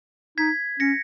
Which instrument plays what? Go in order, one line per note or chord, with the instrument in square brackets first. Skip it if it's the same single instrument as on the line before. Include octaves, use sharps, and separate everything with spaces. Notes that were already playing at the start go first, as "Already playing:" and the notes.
[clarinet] D#4 [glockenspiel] G#6 B6
[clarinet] C#4 [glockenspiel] A#6 C#7